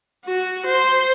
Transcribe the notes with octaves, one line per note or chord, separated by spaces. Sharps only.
F#4
C5